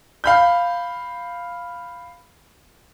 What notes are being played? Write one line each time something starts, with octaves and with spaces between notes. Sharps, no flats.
F5 B5 G6